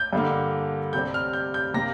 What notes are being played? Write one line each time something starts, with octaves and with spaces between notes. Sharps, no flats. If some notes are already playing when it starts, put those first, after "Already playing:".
Already playing: G6
G2 D3 A#3
C3 G3 C4 G6
F6
G6
G6
C3 A#3 A#6